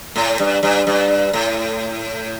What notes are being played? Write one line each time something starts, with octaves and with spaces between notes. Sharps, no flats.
A2
G2
G2
G2
A2